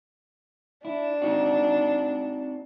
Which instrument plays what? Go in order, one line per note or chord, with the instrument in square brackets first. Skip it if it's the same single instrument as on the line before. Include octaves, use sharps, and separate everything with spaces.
[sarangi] D4 [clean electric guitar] E4
[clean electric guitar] C4 D#4 F#4